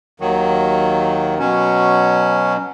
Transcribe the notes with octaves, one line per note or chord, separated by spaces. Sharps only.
D#2 D#3 F#3
B2 F#3 C#4